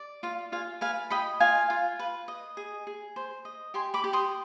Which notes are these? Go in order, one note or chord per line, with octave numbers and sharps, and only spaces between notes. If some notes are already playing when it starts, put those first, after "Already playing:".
Already playing: D5
F4 F5
F4 F5 G#5
B4 F5 G#5
D#5 G5 B5
F4 F5 G#5
F4
B4
D#5
G#4
G#4
C5
D#5
G4 G#5 C6
B5 D6
G4
C6 D#6